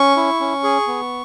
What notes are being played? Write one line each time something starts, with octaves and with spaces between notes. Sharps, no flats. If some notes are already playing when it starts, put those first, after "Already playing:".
Already playing: C#4 C#6
E4
C#4
G#4
B3